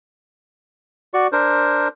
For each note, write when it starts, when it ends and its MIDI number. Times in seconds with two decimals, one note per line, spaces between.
1.14 1.27 66
1.14 1.27 74
1.14 1.27 85
1.32 1.88 62
1.32 1.88 70
1.32 1.88 72